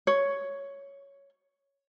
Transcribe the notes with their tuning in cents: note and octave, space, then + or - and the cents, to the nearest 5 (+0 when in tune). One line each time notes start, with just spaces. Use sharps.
C#5 +5